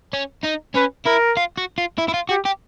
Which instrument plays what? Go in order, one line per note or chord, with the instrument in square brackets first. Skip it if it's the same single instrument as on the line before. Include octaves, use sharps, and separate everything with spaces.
[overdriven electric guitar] C#4
D#4
[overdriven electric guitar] C#4 [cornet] B4
[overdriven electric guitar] E4 [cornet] A#4
[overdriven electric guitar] F4
F#4
F4
E4
E4
F4
[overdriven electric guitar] F#4 [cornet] G4
[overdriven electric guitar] G4